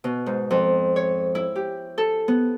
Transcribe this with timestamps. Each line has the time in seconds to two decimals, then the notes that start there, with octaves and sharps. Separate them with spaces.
0.04 B2
0.26 G#2
0.51 F2
0.96 C#5
1.35 E4
1.56 G4
1.98 A4
2.28 B3